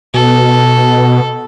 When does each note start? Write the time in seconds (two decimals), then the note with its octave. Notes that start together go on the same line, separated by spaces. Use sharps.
0.14 B2 A4